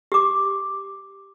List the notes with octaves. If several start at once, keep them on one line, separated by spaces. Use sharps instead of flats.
G4 D6